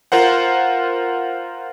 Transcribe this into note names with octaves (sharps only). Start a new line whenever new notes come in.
F4 A#4 C5 F#5